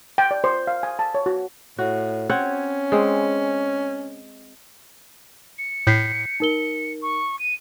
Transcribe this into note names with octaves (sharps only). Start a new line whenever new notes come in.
G5
D5
C5
F5
G#5
A5
C#5
F#4
A2 F#4
C4 C#4 C#5 F#5
G#3 C4
C#7
A2 G6 B6 C7
D#4 A#4 G7
C#6
D#7